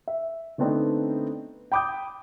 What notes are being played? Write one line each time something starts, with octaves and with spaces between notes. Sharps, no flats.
E5
D3 A3 B3 C4 D4 D#4
G5 B5 D6 D#6 G6